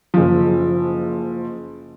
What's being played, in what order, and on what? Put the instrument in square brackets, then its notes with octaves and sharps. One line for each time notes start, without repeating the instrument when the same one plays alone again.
[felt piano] F#1 F3